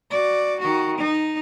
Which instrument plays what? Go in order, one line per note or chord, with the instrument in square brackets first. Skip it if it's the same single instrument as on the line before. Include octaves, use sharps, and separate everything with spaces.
[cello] F#4 D5
D#3 F#4
D#4